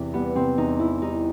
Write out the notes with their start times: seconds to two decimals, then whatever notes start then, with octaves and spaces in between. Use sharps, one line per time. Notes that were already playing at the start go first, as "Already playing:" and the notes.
Already playing: E2 C3 E3
0.14 G3 B3
0.36 C3 C4
0.58 E2 D#4
0.79 E3 E4
1.02 G3 D#4